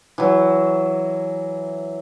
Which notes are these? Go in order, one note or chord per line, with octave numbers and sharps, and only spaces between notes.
E3 F#3